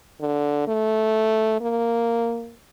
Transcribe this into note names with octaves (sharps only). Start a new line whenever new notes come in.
D3
A3
A#3